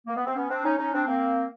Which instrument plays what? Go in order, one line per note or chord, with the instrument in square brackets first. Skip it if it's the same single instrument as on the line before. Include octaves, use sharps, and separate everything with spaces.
[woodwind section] A#3
B3
C4
B3 C#4
C4 D4
C#4 D#4
C#4 D#4
C4 D4
A#3 C4